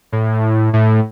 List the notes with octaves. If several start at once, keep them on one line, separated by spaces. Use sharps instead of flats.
A2
A2